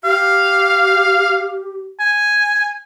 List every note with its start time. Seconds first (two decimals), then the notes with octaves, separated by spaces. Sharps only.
0.04 G4 F5
2.00 G#5